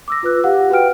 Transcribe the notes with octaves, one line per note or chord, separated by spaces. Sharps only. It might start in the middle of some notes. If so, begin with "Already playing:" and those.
D6 E6 A#6
F4 B4 F#6
G4 F5 F#5
F#4 B4 F#5 G5 F6 D7